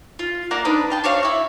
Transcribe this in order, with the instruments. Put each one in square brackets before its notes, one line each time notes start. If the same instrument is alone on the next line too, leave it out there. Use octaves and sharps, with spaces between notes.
[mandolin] F4
A#3 A#4 D5 F#5
D4 D#4 B4
F5 G5 A5
D4 F#4 C#5 F5
E4 E5